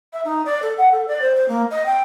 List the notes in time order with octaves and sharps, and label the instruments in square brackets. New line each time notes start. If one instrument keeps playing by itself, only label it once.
[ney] E5
D#4
D5
A4
F#5
A4
D5
C5
C5
A#3
D#5
G5